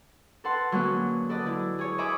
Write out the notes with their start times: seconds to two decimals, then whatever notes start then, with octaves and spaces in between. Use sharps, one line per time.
0.44 A4 B4 F#5 A5 C6
0.72 D3 F#3 G#3 A#3 B3 C#4
1.29 A4 B4 D5 D#5 A5
1.45 D3 E4
1.79 G#4 C#5
1.98 D#5 E5 G#5 B5 C#6 D6